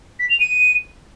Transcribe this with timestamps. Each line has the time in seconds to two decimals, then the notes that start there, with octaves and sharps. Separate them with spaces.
0.19 B6
0.30 F7
0.40 D#7